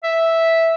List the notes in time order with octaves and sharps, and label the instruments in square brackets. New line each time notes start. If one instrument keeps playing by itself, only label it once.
[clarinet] E5